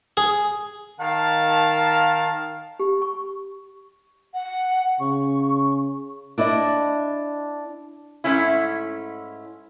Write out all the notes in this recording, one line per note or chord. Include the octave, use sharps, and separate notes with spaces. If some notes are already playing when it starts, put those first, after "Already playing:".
G#4
D#3 F5 A5
G4
C#6
F#5
C#3 C#6
D4 E4 D5 D#5
G#2 A3 C#4 E4